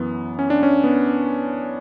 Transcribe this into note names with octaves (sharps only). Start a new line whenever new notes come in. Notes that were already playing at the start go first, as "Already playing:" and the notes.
Already playing: F#2 E3 B3
C#4
D4
C#4
B3